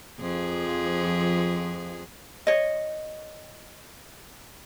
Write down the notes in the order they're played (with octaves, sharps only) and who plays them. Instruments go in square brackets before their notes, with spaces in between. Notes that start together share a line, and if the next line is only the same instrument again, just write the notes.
[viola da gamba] F2 F3 G#4
[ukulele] C#5 D#5